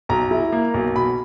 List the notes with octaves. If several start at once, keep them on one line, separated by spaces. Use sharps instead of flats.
B1 A#5
E4
A#3
B1
B2 B5